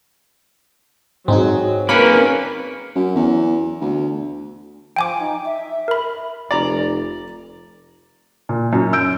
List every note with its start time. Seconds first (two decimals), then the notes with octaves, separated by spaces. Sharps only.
1.28 G#2 F#3 C4 D#4 G#4
1.89 A#3 C#4 A#4 B4 B5
2.95 F#2
3.15 E2
3.81 D2
4.96 F3 G5 G#5 D6
5.19 D#4
5.45 E5
5.88 A#4 B5
6.51 F1 D5 A#5
8.49 A#2
8.73 F#2
8.93 E6 G6 D7